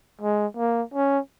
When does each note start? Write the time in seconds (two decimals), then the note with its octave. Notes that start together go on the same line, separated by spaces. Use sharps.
0.22 G#3
0.57 A#3
0.94 C#4